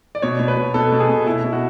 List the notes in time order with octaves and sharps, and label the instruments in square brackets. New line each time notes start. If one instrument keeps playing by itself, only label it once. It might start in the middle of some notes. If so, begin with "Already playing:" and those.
[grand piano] D5
B2 C#5
B2
B4
B2
B2 A4
B2
G#4
B2
B2 E4
B2
F#4